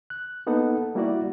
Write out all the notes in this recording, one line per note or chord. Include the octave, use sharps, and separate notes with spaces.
F#6
A#3 B3 D#4 A4 F#5
G3 A#3 E4 F#4 D5